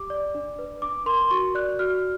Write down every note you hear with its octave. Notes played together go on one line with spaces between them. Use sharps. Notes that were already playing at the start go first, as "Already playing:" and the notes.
Already playing: G4 D6
D5
D4
B4
D4 D6
A#4 C6
F#4 C#6
D5 F#6
F#4 F6